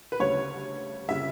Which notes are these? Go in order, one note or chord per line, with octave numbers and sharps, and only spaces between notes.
B4
D2 C#3 G3 C#5
C#3 G3 E5